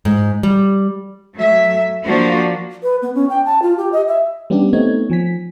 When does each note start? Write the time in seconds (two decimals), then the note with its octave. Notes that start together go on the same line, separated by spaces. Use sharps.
0.05 G#2
0.43 G3
1.36 F#3 A3 E5
2.05 F3 A#3 D4 F#4
2.83 B4
3.02 B3
3.15 C#4
3.29 G5
3.45 A5
3.62 F4
3.77 G4
3.92 D#5
4.08 E5
4.50 G3 B3 C#4 D4 G4
4.73 A3 B3 C4 D#4 C#5 G#6
5.10 F3 G#5 B6